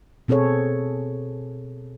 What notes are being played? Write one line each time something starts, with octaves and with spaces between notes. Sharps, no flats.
B2 C4 G#4 A4 C#5